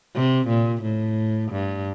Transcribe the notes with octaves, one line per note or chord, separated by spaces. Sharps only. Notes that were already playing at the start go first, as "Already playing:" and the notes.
C3
A#2
A2
G2